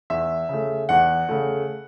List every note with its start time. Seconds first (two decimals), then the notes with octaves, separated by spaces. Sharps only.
0.10 E2 E5
0.49 C#3 A3
0.89 E2 F#5
1.29 C#3 A3